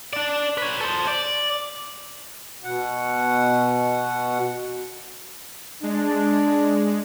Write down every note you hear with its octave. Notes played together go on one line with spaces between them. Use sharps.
D4 D5
B4 C#5
A4 C5
D5
B2 F#5
G#3 D4